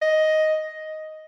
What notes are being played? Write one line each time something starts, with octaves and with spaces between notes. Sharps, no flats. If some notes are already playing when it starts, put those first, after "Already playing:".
D#5